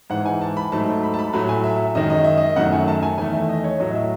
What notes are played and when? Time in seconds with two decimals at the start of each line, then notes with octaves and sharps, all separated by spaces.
0.10 G#2 E3 G#3 F#5
0.25 G#5
0.42 A5
0.57 B5
0.72 G#2 F#3 A3 A5
1.03 B5
1.14 A5
1.19 B5
1.33 A2 F#3 A3 B5
1.49 G#5
1.64 E5
1.95 F#2 D#3 G#3 D#5
2.10 D#5
2.24 E5
2.38 D#5
2.56 F#2 D#3 F#3 A3 F#5
2.72 G#5
2.88 A5
3.03 G#5
3.18 E2 D#3 A3 G#5
3.34 E5
3.49 D#5
3.64 C#5
3.80 A2 F#3 A3 D#5
3.95 E5